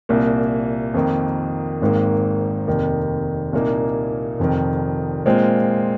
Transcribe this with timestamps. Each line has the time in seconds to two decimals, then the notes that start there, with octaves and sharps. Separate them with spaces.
0.09 C2 A#2 A#3
0.94 F2 D#3 A#3
1.81 G#1 G#2 D#3 A#3
2.67 F1 D#2 D#3
3.53 C2 A#2 A#3 D#4
4.39 F1 F2 D#3
5.26 A#2 G#3 C4 F4